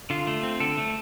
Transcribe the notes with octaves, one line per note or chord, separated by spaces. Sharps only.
D3 F4
A3
C4
D3 A4
A3